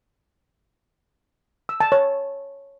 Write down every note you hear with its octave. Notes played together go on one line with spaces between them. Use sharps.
E6
A5
C#5